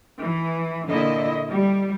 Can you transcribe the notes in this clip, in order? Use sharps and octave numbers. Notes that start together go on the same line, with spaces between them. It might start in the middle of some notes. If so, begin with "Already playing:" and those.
E3
A#2 D3 E4 D#5
G3